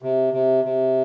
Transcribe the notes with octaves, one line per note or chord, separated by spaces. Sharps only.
C3
C3
C3